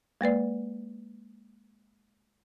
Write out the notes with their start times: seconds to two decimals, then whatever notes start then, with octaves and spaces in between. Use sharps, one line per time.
0.21 G#3 A#3 B4 D5